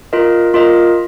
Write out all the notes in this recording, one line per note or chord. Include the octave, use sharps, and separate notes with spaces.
F4 A#4 D#5
F4 A#4 D#5